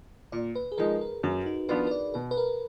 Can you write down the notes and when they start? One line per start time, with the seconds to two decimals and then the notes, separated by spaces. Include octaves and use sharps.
0.32 A#2 D5
0.55 B4
0.72 G#4
0.78 F3 G#3 D#4 A#4
1.01 A#4
1.23 F#2 F#4
1.46 D#4
1.69 F3 B3 D4 F4 B4
1.87 B4
1.91 D5
2.14 B2 B4
2.31 B4
2.37 A#4